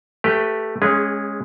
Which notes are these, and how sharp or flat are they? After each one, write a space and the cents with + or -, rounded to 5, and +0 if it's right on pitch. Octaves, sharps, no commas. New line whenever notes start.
A3 +5 G4 +0 B4 +0
G#3 +0 C#4 -5 G#4 -30